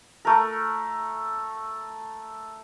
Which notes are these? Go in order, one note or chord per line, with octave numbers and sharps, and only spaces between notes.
A3 A#4